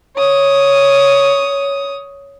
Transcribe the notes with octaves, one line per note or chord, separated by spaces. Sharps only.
C#5 D#6